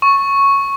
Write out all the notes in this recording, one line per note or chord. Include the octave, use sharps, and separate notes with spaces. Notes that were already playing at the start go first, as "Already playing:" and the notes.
C#6